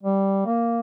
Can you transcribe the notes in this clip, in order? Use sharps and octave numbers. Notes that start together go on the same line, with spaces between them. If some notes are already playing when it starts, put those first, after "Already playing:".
G3
A#3